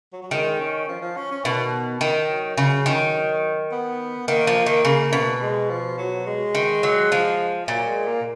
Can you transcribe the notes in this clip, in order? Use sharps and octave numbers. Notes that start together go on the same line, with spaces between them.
F#3
F#3
D#3 G#3
C#4
F3
F3
C#4
C#4
B2 D#3
D#3
F#3
C#3
D#3
B3
D#3 A#3
F3
D#3
C#3
B2
G#3
F3
F#3
G#3
D#3
F#3
F3
A#2 F#3
G#3
A#3